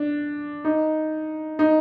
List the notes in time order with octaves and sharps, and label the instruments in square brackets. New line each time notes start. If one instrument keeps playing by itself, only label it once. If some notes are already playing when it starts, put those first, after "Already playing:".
Already playing: [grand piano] D4
D#4
D#4